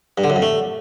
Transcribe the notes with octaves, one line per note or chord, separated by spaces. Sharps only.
G2
D3
F#2
F2
A3